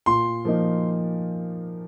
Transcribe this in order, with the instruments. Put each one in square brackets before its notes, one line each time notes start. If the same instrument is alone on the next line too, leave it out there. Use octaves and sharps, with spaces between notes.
[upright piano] A#2 [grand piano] C6
[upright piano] F3 A#3 D#4